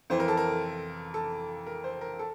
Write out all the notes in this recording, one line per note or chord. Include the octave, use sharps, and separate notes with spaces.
F2 E3 C5
A#4
A4
A#4
A4
A#4
C5
A#4
A4